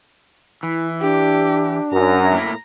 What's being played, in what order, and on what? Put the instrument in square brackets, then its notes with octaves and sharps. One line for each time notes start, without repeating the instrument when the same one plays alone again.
[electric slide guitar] E3 [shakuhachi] E4
[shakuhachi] D4 [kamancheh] G4
[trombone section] F#2 [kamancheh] A#5
[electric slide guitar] A2 A#3 E4